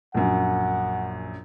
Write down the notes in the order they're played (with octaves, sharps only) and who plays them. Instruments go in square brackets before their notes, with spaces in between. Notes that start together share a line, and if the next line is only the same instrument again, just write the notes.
[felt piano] A#1 F#2 [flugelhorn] F#5